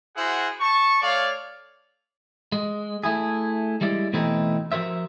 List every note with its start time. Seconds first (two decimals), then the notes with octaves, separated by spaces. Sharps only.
0.17 E4 F#4 G#4 C5 F#5
0.61 A5 C#6
1.02 A3 C#5 D5 F5
2.52 G#3
3.04 A3 E4 G#4
3.81 G3 G#3 E4 D5
4.13 B2 E3 A3 C4 D#4 E4
4.72 F3 F#4 A#4 C5 E5